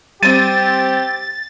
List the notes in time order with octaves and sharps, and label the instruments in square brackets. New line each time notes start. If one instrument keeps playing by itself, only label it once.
[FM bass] G3 [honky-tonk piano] C4 D#7 [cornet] G4 [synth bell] A6